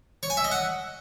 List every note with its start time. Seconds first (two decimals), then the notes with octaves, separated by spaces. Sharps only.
0.23 C#5
0.30 G#5
0.37 E5
0.44 D#5
0.52 F#5